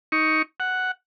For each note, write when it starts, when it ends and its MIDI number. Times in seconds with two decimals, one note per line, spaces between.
0.12 0.42 63
0.12 0.42 85
0.60 0.91 78